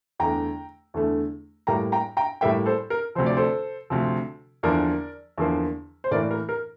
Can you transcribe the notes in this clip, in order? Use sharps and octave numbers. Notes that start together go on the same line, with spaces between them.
E2 D3 A3 G5 A#5
E2 D3 A3
A2 G3 A#3 G5 A#5
G5 A#5
G5 A#5
A2 G3 A#3 E5 G5
A4 C5
A#4
D2 C3 F3 C5
D5
A4 C5
D2 C3 F3
E2 D3 F3 A#3 A#4 D5
E2 D3 F3 A#3
C5
A2 E3 A#3 A#4 D5
A#4
A#4